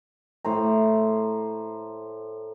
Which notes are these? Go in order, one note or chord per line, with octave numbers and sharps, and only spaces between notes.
A2 C5 A#5